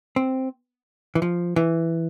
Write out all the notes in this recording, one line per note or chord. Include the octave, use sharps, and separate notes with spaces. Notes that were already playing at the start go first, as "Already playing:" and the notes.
C4
E3
F3
E3